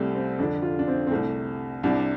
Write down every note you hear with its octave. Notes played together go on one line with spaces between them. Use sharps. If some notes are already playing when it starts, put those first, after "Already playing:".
Already playing: C2 C3 G3 A3
C4
F2 D3 D4
F4
D4
C4
C4
C2 C3 A3
C2 C3 D4